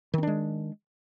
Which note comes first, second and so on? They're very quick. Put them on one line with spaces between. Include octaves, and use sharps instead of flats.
D#3 C4 D4 G#3